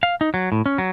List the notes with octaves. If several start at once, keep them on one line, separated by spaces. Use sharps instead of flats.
F5
D#4
F#3
A2
C#4
F#3